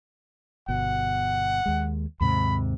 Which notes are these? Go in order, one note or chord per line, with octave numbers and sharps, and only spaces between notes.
G1 B2 F#5
D#2 G#3
D#2 G#2 C3 B5